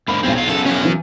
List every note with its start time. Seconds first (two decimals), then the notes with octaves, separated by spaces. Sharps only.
0.08 G#2 D3 A#3 B5
0.23 B1 E2 C4 C#4 F4
0.35 F#3 F4
0.49 F#2 C#3 B3 A4
0.66 F#3 C#4
0.85 E3